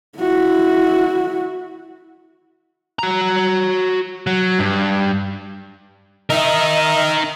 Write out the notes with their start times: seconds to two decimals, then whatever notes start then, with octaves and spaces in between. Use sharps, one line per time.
0.19 E4 F#4
2.99 F#4 A#5
4.27 F#3
4.59 G2
6.30 D#4 A#4 D#5 E5